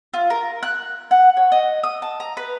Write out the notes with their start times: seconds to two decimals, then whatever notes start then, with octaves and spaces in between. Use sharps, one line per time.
0.14 F4
0.30 A#4
0.63 F#6
1.11 F#5
1.37 C#5
1.52 D#5
1.84 D#6
2.02 A5
2.20 A#5
2.37 B4